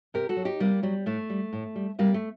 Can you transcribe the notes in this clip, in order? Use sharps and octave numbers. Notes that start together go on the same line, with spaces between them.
C3 G4 A#4
F#4 A4
F#3
D#4 G4
C3 G3 A#3
F#3 G3
A2 A3
G3
A2
G3
C3 G3 A#3
A3